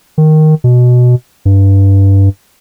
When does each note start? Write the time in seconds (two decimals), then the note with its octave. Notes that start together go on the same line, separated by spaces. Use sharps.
0.18 D#3
0.64 B2
1.45 G2